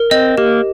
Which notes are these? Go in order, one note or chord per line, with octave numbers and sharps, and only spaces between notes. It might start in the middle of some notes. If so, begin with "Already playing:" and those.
Already playing: A#4
C4 D#5
A#3 G4